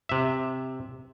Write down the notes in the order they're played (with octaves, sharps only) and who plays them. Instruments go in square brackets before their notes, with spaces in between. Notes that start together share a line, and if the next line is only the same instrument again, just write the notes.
[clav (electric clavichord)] C3 E5